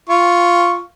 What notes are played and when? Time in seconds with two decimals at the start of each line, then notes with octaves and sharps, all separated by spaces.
0.09 F4 C#6